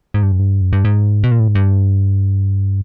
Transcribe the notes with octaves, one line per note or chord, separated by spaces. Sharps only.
G#2
G2
F#2
G2
F#2
G2
G#2
B2
A#2
A2
G#2
G2